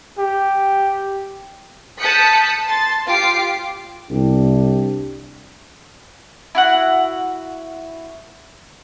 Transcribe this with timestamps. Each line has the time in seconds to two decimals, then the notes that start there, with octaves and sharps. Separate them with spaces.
0.18 G4
2.00 A5 D#6 F#6 G6 B6 C#7
2.66 A5 C6 A6
3.08 F4 G4 D6 C7 D7
4.10 C2 D4 G4
6.55 E4 F#4 F#5